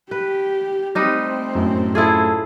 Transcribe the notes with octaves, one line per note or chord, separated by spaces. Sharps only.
G4 B4
G3 A3 C4 D#4 B4
F#2 A2
E4 F4 G#4 A4